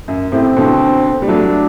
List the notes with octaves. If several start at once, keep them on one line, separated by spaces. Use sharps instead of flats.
F#2
A2 C3 C4
B2 D3
G3
F#3 A3 D4